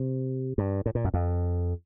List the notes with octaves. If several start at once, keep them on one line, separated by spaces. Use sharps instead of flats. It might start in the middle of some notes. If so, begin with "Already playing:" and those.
Already playing: C3
G2
A2
A#2
F#2
F2